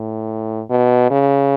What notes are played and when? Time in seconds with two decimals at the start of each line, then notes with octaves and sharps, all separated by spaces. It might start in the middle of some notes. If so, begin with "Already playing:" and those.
Already playing: A2
0.70 B2
1.11 C#3